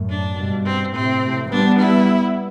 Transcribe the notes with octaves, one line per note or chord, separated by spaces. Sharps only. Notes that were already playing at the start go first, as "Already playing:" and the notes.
Already playing: F#2 A2
D4
G2 B2
C4
A2 C3 C4
A2 C3
G3 B3 D4
E4